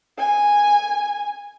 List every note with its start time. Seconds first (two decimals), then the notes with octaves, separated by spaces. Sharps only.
0.18 G#5